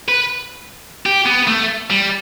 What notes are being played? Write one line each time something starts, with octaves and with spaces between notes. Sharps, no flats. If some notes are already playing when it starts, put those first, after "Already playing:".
B4
G4
B3
A3
G3